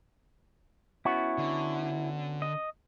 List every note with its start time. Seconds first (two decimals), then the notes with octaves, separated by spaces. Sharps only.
1.05 B3 C#4 E4 F#4
1.38 D3
2.42 D#5